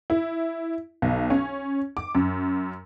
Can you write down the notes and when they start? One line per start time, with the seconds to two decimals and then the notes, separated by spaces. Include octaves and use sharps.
0.10 E4
1.02 B1
1.30 C#4
1.97 D6
2.15 F#2